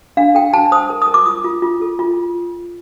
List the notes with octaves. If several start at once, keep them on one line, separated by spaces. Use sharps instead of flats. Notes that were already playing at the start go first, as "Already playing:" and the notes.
D4 F5
A4 G5
D4 A5
C5 D#6
A#4
D#6
A#4
D6
F4 D#6
F4
F4
A4
F4